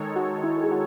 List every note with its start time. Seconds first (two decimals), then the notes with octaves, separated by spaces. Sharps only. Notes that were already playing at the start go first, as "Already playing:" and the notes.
Already playing: D#3 G#3 D#4 A4 C#5
0.16 F#4
0.44 E4
0.64 G#4
0.71 F#4